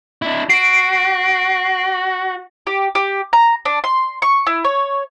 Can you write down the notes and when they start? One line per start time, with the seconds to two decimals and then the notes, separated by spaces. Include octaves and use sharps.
0.22 D4 E4
0.49 F#4 C7 D7
2.67 G4
2.95 G4
3.33 A#5
3.65 D4
3.84 C6
4.22 C#6
4.47 E4
4.64 C#5